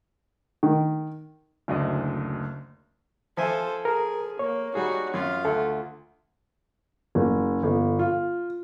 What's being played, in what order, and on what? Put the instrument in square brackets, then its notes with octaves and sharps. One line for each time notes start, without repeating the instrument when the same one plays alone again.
[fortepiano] D#3
[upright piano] F#1 D2 D4 D#5
[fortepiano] F3 E5 G#5 [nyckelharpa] A4 C5
[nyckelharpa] G#4 [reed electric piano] A#4
[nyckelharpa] A#3 [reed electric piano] C#5
[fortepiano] G3 D#4 G#4 [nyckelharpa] F#4
[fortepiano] F#2 [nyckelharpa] F4
[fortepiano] D2 [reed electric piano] A4 E5
[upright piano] F#1
G1
F4